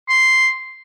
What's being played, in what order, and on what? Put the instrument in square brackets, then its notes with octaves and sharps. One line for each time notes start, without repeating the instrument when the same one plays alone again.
[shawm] C6